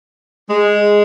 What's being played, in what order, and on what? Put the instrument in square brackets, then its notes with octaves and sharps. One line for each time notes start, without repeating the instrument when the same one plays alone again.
[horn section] G#3